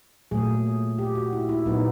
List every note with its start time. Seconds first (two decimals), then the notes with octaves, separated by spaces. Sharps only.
0.31 A#2 F#3 A3 G#4
0.99 G4
1.15 F#4
1.33 E4
1.49 E4
1.66 A#2 F#3 B3 D#4